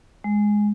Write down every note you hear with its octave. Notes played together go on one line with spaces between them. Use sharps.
G#3